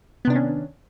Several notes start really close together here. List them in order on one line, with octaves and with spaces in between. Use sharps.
B3 C3 D4 D#3 C#4